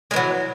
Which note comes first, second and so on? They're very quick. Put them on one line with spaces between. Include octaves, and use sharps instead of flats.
G#3 E3 F#3